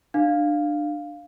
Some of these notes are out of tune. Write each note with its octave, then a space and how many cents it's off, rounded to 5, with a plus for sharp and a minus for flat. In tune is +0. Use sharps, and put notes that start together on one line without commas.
D4 +25 F5 +0